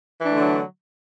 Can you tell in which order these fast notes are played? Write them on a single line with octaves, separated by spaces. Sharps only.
E3 D4 A3 D3 F#3